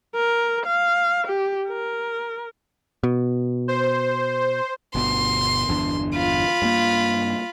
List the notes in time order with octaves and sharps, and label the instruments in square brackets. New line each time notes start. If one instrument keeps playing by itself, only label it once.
[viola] A#4
F5
G4
A#4
[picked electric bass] B2
[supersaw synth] C5
[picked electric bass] G1 B2 [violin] C6
[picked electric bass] G1 E2 D4
[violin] F4 B5
[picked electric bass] G2 A#3